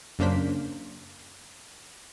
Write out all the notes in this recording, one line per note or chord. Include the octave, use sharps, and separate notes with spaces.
F#2 C#3 A#3 D4 C5 B6